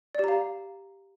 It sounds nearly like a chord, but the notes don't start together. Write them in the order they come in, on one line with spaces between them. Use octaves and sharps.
D5 G4 A#5 F5